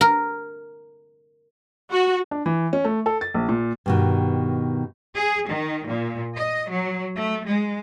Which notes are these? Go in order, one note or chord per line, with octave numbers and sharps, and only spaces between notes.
A#4
F#4
D4
E3
C#4
A3
A4
A6
A#1
A#2
G2 B2 D#3
G#4
D#3
A#2
D#5
F#3
A3
G#3